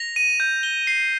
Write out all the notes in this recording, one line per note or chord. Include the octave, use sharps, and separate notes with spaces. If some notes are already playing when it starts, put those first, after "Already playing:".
Already playing: A#6 F7
D#7
G6
G7
C7